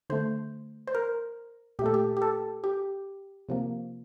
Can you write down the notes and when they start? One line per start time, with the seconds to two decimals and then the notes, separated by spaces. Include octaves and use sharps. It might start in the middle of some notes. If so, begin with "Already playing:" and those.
0.10 D3 A3 C5
0.87 C5
0.95 A#4
1.79 A#2 G4
1.82 A3 A4
1.94 G4
2.17 G4
2.22 A4
2.64 G4
3.49 C3 F3 A#3